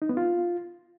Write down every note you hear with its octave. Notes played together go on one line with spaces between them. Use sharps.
D#4
B3
F4